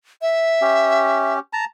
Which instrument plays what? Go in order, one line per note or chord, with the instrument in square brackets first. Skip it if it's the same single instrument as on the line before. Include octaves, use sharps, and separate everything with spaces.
[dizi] E5
[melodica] C#4 G4
A5 A#5